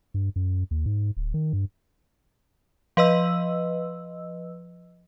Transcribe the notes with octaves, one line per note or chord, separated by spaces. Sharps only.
G2
F#2
D#2
G#2
D1
D#3
G2
F3 B4 D#5 E6